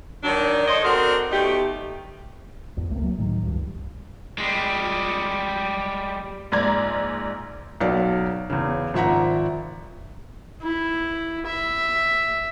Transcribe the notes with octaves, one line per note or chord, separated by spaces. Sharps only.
D#3 F#3 D4
A4 C5 C#5 D#5
C4 D4 F#4 A4 A#4
B2 A3 D#4 G4
G#1 E2
C#2 A3 A#3 C4
F#3
A2 D#3 F#3
C#2 G2
G3 G#3
A#1 G#2 D5 A#5 G#6
B1 F#3 D5
E2 C#3
G#1 F3 E5 F#5 A#5
E4
E5